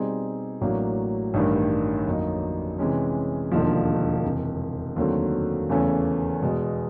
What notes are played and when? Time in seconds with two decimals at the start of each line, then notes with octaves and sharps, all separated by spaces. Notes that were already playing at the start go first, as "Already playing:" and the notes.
Already playing: B2 G3 C4 D#4 G#4
0.61 A1 A2 F#3 A#3 D4
1.34 A1 G2 D#3 G3
2.06 F2 D3 F#3 A#3 D#4
2.79 C3 E3 G#3 C#4
3.51 E1 D#2 D3 F3
4.25 F2 C3 E3
4.96 D#2 D3 F#3 A3 C4
5.70 E2 C#3 E3 A3 C#4
6.42 E2 B2 G#3